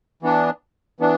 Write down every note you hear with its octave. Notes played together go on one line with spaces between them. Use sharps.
E3 B3 D4
E3 B3 D4